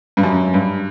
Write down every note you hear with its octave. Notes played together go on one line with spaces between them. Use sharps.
G2
F#2
G2